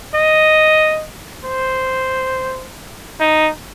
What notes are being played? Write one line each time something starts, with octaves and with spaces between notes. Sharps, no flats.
D#5
C5
D#4